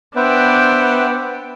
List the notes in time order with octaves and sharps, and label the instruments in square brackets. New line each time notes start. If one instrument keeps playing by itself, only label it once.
[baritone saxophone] B3 [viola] D4 G5 [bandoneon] B4 C5 E5